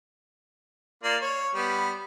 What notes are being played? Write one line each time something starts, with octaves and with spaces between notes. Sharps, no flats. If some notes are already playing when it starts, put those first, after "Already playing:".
A#3 F4 D5
C#5
G3 B3